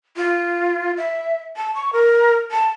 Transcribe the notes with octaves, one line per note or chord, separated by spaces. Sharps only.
F4
E5
A5
C#6
A#4
A5